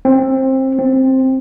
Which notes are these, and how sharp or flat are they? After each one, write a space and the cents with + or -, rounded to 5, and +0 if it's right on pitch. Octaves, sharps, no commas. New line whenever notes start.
C4 +20
C4 +10